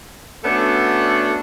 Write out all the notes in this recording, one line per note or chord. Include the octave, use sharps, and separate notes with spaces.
A3 B3 C#4 D4 F#4 A4